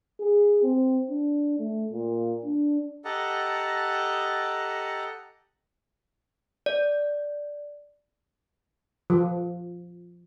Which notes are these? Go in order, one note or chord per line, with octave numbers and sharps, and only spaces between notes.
G#4
C4
D4
A3
A#2
D4
G4 A4 D#5 F#5 A5 A#5
D5
F3